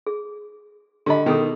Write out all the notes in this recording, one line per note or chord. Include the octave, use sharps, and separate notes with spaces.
G#4
D3 G4 D#5 B5
B2 D#3 C#4 G#4 A4